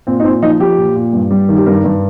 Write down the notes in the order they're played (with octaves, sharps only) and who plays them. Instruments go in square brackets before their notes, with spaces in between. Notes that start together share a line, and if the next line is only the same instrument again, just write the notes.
[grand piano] A#2 C4
D#4
A#2 C4
F3 D#4
F3 G4
A#2
A#2
G2
G3
D#3
G4
G2 A#4
G2